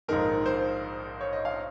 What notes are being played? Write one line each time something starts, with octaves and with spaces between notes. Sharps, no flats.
A#1 G#2 D#3 G#3 A#4
C5
C#5
D#5
F5